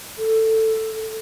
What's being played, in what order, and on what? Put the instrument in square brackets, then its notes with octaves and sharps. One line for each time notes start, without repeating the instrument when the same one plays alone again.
[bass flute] A4